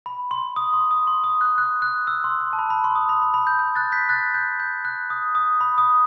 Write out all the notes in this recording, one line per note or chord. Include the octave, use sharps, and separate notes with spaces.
B5
C6
D#6
C6
D#6
C6
D#6
F#6
F#6
F#6
E6
C6
C6
A5
B5
B5
C6
D#6
B5
B5
B5
G6
G6
F#6 A6
G6 B6
F#6 A6
G6
G6
F#6
D#6
D#6
B5
D#6